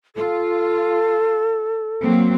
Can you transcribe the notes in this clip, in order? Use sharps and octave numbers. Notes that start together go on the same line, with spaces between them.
F4 A4
F#3 A#3 C4